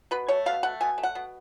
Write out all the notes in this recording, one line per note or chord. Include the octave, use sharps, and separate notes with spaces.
B2 B4
A3 C#5
B2 F5
A3 F#5
B2 G#5
A3
F#5
B2